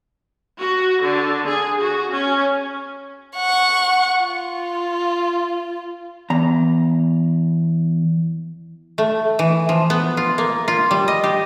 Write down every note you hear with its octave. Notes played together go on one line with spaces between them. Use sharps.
F#4
D3
G#4
F#4
C#4
F#5 C#6
F4
E2 A#5
A3
E3
F3
B3
F4
A#3
F4
G3
D#5
G4